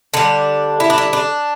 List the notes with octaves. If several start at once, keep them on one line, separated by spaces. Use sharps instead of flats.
D3 G3 D4
E4
D4
E4
D4